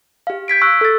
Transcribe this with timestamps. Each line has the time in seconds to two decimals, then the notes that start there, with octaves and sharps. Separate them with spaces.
0.27 G4 F5
0.48 G6 G#6 B6 D7
0.62 C#6 E6 F#6
0.81 A4 A6